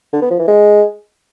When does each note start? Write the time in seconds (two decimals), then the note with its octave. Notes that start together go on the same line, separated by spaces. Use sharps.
0.13 D3
0.22 B3
0.31 F3
0.39 E3
0.48 G#3